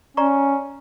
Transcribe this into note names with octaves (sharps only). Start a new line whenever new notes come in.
C#4 D5 A#5 C#6